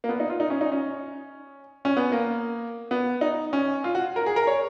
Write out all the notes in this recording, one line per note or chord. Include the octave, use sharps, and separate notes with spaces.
A#3
B3
D#4
F4
D#4
C#4
D#4
C#4
C#4
B3
A#3
B3
D#4
C#4
F4
F#4
A#4
G#4
A#4
C#5